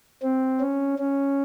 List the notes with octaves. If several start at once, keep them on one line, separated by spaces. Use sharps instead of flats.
C4
C#4
C#4